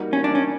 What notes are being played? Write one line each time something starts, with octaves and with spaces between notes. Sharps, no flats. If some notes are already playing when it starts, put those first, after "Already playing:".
Already playing: G3 A#3 D#4 F#4
C#4
D4
C#4